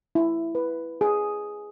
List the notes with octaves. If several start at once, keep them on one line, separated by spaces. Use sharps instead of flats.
E4
B4
G#4